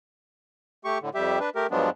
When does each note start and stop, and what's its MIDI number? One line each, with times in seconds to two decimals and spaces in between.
0.85 0.98 57
0.85 0.98 67
0.85 0.98 85
1.02 1.10 45
1.02 1.10 50
1.15 1.39 41
1.15 1.39 55
1.15 1.39 67
1.15 1.39 76
1.40 1.50 62
1.40 1.50 71
1.56 1.67 57
1.56 1.67 67
1.56 1.67 70
1.71 1.90 43
1.71 1.90 53
1.71 1.90 54
1.71 1.90 56
1.71 1.90 59
1.71 1.90 62